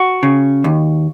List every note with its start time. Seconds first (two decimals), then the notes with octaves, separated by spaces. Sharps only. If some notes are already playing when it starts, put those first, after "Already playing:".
Already playing: F#4
0.23 C#3
0.64 D#2